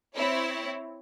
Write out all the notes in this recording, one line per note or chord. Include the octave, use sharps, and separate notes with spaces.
C4 E4 C#5